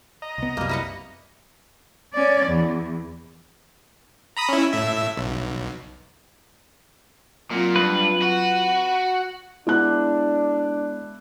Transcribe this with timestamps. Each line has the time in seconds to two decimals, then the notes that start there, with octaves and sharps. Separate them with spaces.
0.22 D#5 A#5
0.38 C2 B3
0.57 C2 F#2 C3 G3 A#3
0.69 E4 B4 F#5
2.14 C#4 D5
2.46 E2
4.37 A#5 B5 D#6
4.49 C#4 E4
4.73 A2 E5
5.17 B1
7.51 A#2 F#3 C4 F4
7.76 G2 B4
8.22 F#4
9.67 G#3 B3 D4 E4 F#6